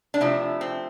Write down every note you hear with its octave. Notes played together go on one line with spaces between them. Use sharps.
D4
C3 F3 A3 E4
C4